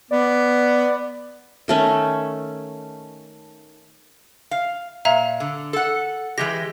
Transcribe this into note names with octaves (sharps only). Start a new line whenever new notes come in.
B3 D5
D#3 A3 C#4
F5
A#2 E5 F5 A#5
D3
A4 F#5
E3 G#3 G4 A#6